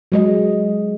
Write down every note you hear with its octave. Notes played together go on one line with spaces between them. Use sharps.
F#3 G#3 D#5